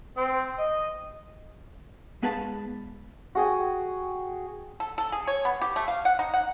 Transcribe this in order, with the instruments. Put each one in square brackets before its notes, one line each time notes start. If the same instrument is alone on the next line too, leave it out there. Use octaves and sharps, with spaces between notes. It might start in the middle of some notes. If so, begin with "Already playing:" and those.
[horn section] C4
D#5
[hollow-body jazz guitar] G#2 B3 G#4 B4 F5 A5
[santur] F#4 G#4 G5
[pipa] A4
A4
G#4
C#5
B3
G4
A3
F5
F#5
D#4
F#5